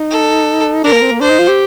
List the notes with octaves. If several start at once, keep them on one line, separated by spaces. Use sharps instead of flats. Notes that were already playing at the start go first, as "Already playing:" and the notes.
Already playing: D#4
A4
D4 A#4
A#3
C4
A#3
D4 C5
D#4
F4
G4